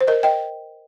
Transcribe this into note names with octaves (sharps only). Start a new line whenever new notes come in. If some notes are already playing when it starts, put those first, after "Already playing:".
C5
A#4 D#5
D#5 G5